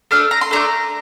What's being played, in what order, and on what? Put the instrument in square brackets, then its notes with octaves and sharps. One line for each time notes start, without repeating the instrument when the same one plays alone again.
[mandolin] A3 D4 A4 F6
A#5
C6
A3 D4 A4 A#5